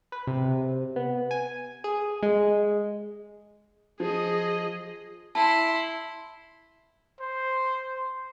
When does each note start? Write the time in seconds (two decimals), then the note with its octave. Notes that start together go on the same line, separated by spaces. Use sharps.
0.12 B4
0.27 C3
0.96 B3
1.31 G#5
1.84 G#4
2.23 G#3
4.00 F3 G#4 D#5
5.35 E4 A5 C6
7.20 C5